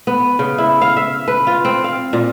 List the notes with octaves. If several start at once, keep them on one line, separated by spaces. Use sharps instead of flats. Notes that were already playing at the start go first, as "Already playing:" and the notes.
B3
C#3
E4
F5
E5
B4
F4
C4
F5
A#2